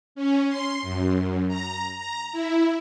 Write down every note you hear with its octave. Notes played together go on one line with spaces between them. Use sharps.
C#4
C6
F#2
A#5
A#5
E4